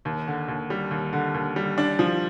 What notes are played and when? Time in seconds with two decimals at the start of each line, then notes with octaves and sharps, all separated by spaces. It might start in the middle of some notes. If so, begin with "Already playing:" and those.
0.05 D#2
0.27 D3
0.48 D#2
0.70 G3
0.91 D#2
1.13 D3
1.34 D#2
1.56 G3
1.78 D4
1.99 F3